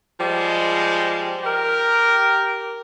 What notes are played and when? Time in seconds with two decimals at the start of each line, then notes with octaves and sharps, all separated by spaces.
0.20 F3 G3 G#3
1.44 G4 A#4